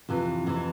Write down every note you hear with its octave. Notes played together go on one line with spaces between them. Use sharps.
F2 C3 E3
F2 C3 E3